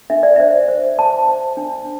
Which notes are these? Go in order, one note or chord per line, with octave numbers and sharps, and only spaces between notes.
D4 E5
D5
C5 E5
C5
C5 A5
C5
D4